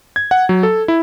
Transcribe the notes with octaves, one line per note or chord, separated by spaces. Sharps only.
G#6
F#5
F#3
A4
E4